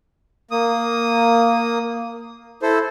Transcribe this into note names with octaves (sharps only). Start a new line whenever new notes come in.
A#3 D#6
E4 A4 C5